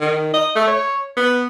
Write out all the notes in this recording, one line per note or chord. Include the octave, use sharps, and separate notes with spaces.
D#3
D#5
A3
C#5
B3